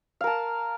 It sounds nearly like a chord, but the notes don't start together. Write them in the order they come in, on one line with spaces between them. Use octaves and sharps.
F5 A#4 A5